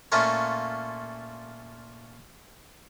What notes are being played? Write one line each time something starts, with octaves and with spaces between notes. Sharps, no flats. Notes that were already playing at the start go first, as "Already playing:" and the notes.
A#2 A3 C#4 F4 A#4 C#5